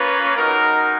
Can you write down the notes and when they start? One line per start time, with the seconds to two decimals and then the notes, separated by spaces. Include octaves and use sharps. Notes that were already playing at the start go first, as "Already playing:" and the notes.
Already playing: A#3 C#4 F4 B4
0.36 G#3 D#4 F#4 A#4